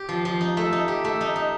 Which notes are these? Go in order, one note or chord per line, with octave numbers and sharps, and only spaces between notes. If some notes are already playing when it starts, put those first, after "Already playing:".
Already playing: G4
F3
F3
D#4
A3
D#4
G4
A3
D#4
D#4